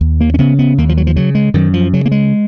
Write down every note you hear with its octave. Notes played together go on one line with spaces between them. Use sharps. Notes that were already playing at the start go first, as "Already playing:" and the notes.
D#2
A#3
C#4
C#3 B3
B3
D#2 A#3
F3
F#3
F3
C#3 F#3
G#3
F#2 D#3
F3
C#3 F#3
A#3
G#3